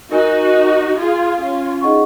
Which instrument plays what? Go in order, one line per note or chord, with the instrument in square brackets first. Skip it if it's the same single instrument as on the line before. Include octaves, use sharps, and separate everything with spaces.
[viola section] D#4 F#4 [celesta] A#4 D#5 G#5
[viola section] F4 G#4
C#4 F4
[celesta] D#4 G#4 D#5 F#5 C#6